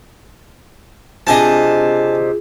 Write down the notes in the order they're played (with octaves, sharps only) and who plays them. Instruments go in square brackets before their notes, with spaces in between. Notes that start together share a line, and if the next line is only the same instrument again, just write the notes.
[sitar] C3 D4 D#5 [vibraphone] F4 G#4 [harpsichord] G#5 A5